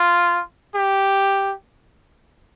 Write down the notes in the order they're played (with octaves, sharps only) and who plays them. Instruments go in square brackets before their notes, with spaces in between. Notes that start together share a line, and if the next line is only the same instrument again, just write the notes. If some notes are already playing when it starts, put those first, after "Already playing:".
Already playing: [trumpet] F4
G4